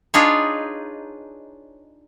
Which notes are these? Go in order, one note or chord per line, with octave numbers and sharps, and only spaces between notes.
D4 D#4 F4 G#4 B4 C#5